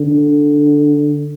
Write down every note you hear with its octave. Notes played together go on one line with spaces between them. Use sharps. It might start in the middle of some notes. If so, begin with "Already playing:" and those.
Already playing: D3